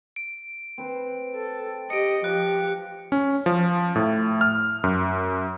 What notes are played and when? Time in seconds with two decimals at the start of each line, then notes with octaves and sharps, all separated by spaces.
0.16 D7
0.78 C4 B4 C5
1.34 A4
1.90 G4 D#5 C#7 D7
2.24 F3 G4 F#6
3.12 C#4
3.46 F3
3.95 A2
4.41 F6
4.84 F#2